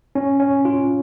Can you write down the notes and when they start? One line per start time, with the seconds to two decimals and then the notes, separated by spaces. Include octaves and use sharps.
0.15 C#4
0.40 C#4
0.65 F4